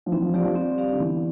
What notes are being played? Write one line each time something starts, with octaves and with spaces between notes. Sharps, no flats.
F3
E3 C4
F3
F3 G4 D5 F5
F3
G3 C4
G4 D5 F5
D3
E3 B3